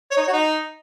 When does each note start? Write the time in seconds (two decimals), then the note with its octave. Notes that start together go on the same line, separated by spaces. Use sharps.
0.11 C#5
0.17 D#4
0.22 C#5
0.27 F#4
0.33 D#4